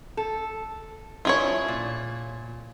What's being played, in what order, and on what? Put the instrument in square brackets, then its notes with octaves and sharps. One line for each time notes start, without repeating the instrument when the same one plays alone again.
[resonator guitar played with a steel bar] A4
[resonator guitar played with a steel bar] C#4 D4 E4 [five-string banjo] F4 G#4 C#5
[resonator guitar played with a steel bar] A#2